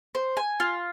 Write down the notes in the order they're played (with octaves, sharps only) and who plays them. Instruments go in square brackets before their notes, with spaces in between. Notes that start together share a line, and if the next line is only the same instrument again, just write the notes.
[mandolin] C5
G#5
F4